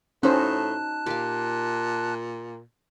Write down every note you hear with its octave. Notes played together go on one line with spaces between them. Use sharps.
A2 C#4 D#4 F#4 C5 A5 F#6
A#2 G4 F5